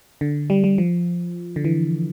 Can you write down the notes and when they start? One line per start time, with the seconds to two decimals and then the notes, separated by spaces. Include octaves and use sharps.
0.21 D3
0.50 G3
0.64 G3
0.78 F3
1.56 D3
1.65 E3